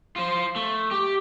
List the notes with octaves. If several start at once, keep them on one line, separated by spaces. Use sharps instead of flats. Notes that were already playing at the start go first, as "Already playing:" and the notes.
F4 C5
A3
G4